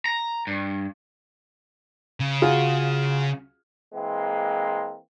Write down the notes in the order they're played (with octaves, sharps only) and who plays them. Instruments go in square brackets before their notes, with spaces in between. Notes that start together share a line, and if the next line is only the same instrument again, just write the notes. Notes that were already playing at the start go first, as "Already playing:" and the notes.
[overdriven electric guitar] A#5
G2
[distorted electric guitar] C#3
[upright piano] F4 F#4 G#4
[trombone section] E3 G#3 A#3 C4